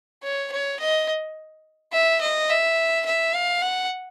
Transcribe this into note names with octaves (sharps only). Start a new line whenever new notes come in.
C#5
C#5
D#5
E5
D#5
E5
E5
F5
F#5